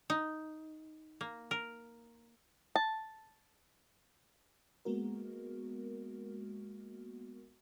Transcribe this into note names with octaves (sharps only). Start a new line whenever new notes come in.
D#4
A#3
A#4
A5
G#3 A#3 B3 F#4 A#4